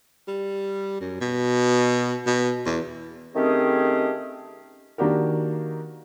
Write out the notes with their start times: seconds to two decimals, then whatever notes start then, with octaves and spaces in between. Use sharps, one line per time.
0.28 G3
1.00 F#2
1.21 B2
2.26 B2
2.66 E2
3.35 D#3 A3 C4 C#4 G4 G#4
4.98 D#3 A#3 D4 F#4 G4 A#4